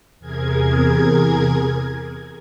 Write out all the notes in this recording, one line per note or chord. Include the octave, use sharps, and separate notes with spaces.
E2 C3 G#4 A#4 G#6